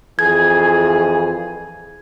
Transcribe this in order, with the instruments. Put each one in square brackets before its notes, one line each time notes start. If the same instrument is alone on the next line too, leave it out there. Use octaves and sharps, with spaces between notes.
[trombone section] F2 E3 G#4 [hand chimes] G#6